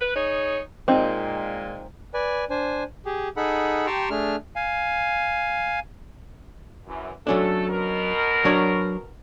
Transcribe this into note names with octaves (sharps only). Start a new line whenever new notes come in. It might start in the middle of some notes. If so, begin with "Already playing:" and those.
B4
D#4 G#4 C#5
A#2 G#3 C4 D#4
B4 D5 G#5
D4 C5 G#5
G4 G#4
D#4 G#4 A4 F#5 B5
G4 G5 A5 A#5 C6 C#6
A3 D4 G#4 F6
F5 G#5
F#2 E3
F#3 A3 C#4 D4 A4
B2 A#4
F#3 D4 C#5